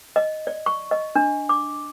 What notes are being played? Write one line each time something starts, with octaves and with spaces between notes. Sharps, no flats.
D#5
D5
C#6
D#5
D4
D6